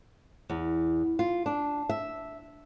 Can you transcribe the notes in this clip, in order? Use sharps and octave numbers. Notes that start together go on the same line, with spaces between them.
E2
F4
D4
E5